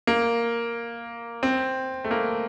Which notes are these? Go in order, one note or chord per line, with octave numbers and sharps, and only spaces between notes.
A#3
C4
A3
A#3